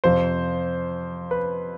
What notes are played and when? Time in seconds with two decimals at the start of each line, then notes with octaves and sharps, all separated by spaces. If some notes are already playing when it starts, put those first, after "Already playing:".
0.04 F2 C3 F3 C5
1.31 B4